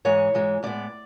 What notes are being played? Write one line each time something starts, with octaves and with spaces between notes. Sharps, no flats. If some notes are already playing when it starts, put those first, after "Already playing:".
G#2 E3 G#3 C#5
G#2 E3 G#3
A2 G#3 B3 D5